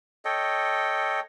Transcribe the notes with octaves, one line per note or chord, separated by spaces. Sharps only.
A4 C#5 D#5 G5